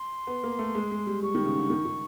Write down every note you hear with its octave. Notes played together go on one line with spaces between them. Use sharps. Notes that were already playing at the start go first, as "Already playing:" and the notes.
Already playing: C6
B3
A#3
A3
G#3
G#3
G3
G3 C#6
D#3
C#3
D3
D#3
D#3